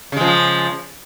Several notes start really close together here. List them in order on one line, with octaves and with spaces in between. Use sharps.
C#3 G#3 F3